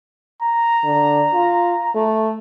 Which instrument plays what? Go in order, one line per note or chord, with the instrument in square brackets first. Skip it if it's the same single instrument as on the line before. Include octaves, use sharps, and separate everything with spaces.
[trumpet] A#5
[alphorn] D3
F4
A3